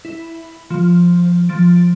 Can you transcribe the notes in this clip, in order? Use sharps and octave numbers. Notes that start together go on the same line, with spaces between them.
E4
F3
F3 A6 D7